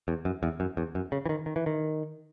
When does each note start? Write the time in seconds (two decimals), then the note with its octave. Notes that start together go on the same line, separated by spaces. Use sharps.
0.08 E2
0.25 F#2
0.43 E2
0.60 F#2
0.77 E2
0.95 F#2
1.12 C#3
1.26 E3
1.29 D#3
1.46 D#3
1.56 E3
1.66 D#3